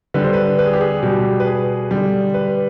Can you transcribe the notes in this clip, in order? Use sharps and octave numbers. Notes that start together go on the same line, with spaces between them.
D3 G3 B4
C5
B4
B4
G#4
G4
G#4
B2 G3 G4
B4
G#4
D3 G3
B4